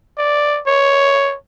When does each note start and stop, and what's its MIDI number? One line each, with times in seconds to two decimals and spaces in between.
0.18 0.60 74
0.67 1.35 73